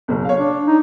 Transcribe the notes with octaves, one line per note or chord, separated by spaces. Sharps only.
F#1 B1
C#5 F5
D4
D#4